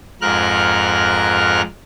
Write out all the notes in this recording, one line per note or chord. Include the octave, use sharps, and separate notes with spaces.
F2 G#2 A#4 F6 F#6